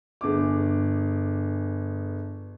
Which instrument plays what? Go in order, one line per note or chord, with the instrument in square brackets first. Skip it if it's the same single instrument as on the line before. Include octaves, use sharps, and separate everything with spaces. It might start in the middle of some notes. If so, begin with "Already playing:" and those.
[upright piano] G1 G#4 D6